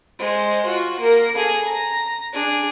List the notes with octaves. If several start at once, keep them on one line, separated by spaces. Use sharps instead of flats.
G#3 C5
F4 F#4
A#3 A#4
G#4 A4
A#5
D4 G#4